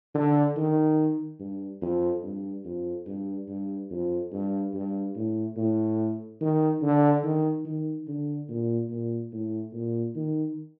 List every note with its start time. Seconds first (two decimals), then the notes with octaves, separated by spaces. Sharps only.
0.15 D3
0.56 D#3
1.40 G2
1.82 F2
2.23 G2
2.65 F2
3.06 G2
3.48 G2
3.90 F2
4.32 G2
4.73 G2
5.15 A2
5.56 A2
6.41 D#3
6.82 D3
7.23 D#3
7.65 D#3
8.07 D3
8.49 A#2
8.90 A#2
9.32 A2
9.73 A#2
10.16 D#3